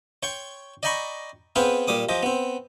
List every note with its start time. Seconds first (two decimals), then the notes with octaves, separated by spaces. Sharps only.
0.23 C#5 G5 C6 C#6
0.83 D5 D#5 G5 A#5 B5 C#6
1.56 B3 C4 G#4 B4 F5 G5
1.88 A#2 G3 D6 D#6
2.09 F3 G4 D#5
2.23 B3 C4